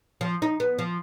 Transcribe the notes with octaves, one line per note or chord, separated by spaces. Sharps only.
F3
D#4
B3
F3